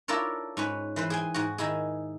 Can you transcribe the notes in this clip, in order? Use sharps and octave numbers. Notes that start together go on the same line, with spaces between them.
D4 E4 F4 A4 A#4 C#5
G#2 C#4 B4
E3 B4 C5
G#4 G5 G#5
G#2 F#4
D#3 D#4 E4 G#4